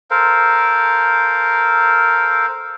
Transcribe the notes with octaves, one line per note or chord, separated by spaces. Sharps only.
A4 A#4 C5 F5